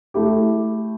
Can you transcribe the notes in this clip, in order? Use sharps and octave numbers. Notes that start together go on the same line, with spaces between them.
A3 E4 G4